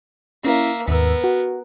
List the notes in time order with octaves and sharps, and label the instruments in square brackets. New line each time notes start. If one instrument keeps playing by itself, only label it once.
[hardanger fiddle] A#3 E5 [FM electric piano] C#4 E4
[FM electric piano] D#2 G#2 E6 [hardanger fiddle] B3 A#4
[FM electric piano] F#4